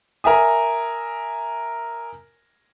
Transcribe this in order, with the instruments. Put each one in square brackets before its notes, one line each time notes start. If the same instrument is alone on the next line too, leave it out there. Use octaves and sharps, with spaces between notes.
[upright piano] A#4 E5 G#5 D#6